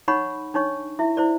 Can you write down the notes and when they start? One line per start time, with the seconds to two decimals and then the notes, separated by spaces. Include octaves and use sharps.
0.08 D#4 C#5 F#5 B5 C#6
0.54 D4 D#4 C#5 C#6
0.99 E4 E5
1.17 E4 C5 D5